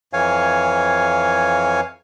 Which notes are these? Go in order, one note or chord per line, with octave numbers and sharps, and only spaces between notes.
F2 E3 C#5 F5 G#5